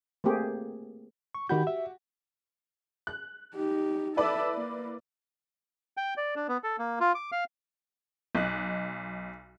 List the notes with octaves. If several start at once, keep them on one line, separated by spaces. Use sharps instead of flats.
A3 A#3 C4 G4 G#4
C#6
D#3 F#4 G4 B5 G6
E5
F#6
D#4 G4
E4 A4 B4 D5 E5
A#3
G5
D5
D4
B3
A4
A#3
F4
D6
F5
B1 D#5 F#6